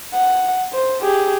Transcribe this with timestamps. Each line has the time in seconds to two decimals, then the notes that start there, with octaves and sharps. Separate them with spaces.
0.14 F#5
0.73 C5
1.02 G4 G#4